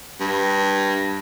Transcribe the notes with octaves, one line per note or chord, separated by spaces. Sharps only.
G2